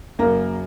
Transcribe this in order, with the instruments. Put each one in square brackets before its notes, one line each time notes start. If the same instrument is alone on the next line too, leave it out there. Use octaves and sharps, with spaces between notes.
[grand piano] F#2 C#3 F#3 [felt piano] A#3